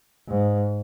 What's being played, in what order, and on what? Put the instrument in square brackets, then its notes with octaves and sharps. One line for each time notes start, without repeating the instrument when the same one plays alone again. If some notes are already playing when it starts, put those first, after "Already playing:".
[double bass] G#2